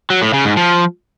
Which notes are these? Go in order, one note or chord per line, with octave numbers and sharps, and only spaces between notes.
F#3
A2
C#3
G#2
F3